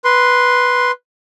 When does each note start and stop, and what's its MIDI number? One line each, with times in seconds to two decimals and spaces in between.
0.04 0.91 71
0.04 0.91 84